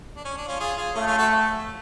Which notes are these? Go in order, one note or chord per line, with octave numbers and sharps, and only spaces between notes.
D4
C#4
D4
C#4 F4
F4 G#4
F4 G#4
A3 C#4 F4
C#4 F4
F#4 A4